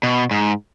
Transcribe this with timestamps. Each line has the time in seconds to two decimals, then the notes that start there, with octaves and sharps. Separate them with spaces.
0.03 B2
0.31 G#2